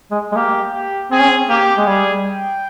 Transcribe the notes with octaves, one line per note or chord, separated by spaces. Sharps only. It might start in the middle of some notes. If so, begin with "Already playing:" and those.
G#3
G#3
A#3 G4
G4
C4 G#4
C#4
C4
A#3 G4
G#3
G3 G#4
G5